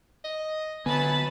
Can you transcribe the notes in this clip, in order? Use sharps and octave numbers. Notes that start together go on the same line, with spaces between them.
D#5
D3 F#3 B3 B4 G#5 A5 B5